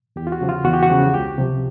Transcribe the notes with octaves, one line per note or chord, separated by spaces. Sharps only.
E2 G4
F4
F#4
C#3 F3
F4
E2 F#4
G4
F#4
C#3 F3
C#2 G4
C3 F3